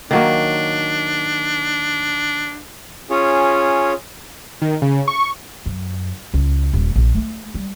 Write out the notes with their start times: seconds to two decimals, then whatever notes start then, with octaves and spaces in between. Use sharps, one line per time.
0.11 D#3 F#3 A#3 D4
3.10 C#4 F4 G#4 C#5
4.62 D#3
4.82 C#3
5.08 C#6
5.66 F#2
6.34 C#2
6.73 D#1
6.96 A#1
7.15 A3
7.54 G3